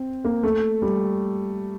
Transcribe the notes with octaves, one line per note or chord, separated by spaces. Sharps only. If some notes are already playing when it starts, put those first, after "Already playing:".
Already playing: C4
A#3
A3
G3